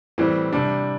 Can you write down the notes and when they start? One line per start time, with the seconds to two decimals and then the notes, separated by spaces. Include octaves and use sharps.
0.18 A2 E3 G3 C4
0.53 C3 G3 D4